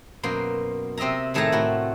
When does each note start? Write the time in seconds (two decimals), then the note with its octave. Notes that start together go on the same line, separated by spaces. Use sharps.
0.23 F#2 B2 A#3 C5
0.97 C3 C4 D#5 E5 A#5
1.34 A2 D#3 A3 G#4 A5 A#5
1.52 A2 F#4